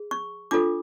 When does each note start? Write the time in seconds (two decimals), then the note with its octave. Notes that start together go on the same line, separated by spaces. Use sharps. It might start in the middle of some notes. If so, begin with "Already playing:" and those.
Already playing: G#4
0.11 C#6
0.51 D4 F4 A4 D6